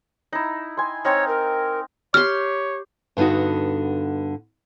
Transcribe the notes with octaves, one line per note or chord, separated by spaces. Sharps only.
D#4 E4
G#5 C6
C4 D#4 C#5 F5
A#4
G4 C#5 C6 F6
G2 D3 B3 D#4 F#4